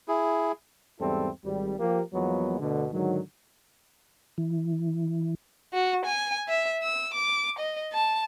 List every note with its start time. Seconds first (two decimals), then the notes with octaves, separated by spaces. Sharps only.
0.08 E4 G#4
1.01 E2 G#2 G3 C4 E4 A4
1.45 G#1 G3
1.79 F3 A#3 G4
2.14 E2 F3 F#3 G#3 A#3 B3
2.60 D2 B2 D3
2.92 G#2 D3 D#3 F#3
4.38 E3
5.73 F#4
6.06 G#5
6.48 E5
6.83 E6
7.14 D6
7.59 D#5
7.93 A5